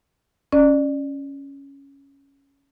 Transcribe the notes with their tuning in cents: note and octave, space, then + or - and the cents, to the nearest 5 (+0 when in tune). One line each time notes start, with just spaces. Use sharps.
C#4 +0 D5 +25